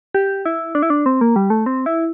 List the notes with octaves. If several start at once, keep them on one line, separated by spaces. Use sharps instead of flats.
G4
E4
D4
E4
D4
C4
A#3
G3
A3
C4
E4